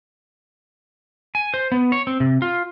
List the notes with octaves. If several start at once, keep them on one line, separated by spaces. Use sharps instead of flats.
G#5
C5
B3
C#5
C4
C3
F4